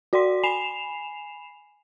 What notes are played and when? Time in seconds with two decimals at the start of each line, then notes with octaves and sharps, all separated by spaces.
0.13 F#4 D5 G5 C6 B6
0.43 G#5 B5 C7 E7 F7